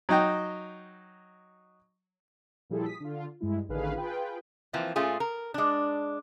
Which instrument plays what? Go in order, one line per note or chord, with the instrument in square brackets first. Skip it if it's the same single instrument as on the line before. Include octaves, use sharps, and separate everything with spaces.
[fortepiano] F#3 D#4 G5
[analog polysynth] A#2 F3 G3 E4 G#4 A4
D#6 B6
D3 F4
G2 G#3 E4
A1 D3 D#3 G#4 B4 F5
F4 G#4 B4 G5
[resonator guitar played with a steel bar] E3 F3 A#3 C4
A#2 A3 C#4 F4 G#4
A#4
G#3 D4